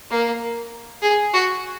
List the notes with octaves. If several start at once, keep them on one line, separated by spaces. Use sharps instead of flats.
A#3
G#4
F#4